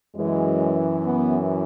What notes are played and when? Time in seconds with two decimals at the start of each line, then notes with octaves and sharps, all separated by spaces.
0.15 F#2 E3 G#3
1.04 B3